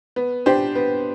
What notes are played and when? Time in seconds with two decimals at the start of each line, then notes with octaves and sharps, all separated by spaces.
0.16 B3
0.46 D4 G4 C5
0.75 B3